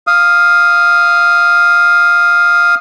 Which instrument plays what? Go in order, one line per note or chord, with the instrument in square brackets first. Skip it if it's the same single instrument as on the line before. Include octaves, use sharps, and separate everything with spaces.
[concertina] F5 D#6